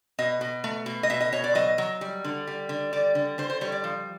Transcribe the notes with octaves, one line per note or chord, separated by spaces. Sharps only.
B2 D#5
B2
A3
B2
D#5
B2 E5
D#5
B2 C#5
D5
F#3 D#5
F#3
G3
D3
G3
D3
G3 D5
D3
D3 C5
C5
G3 C#5
D5
F3